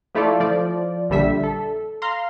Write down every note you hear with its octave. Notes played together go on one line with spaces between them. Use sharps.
F3 A3 E4 F4 A4 D5
F3 D5
A#1 D3 G3 E5 B6
A4
F5 A#5 C6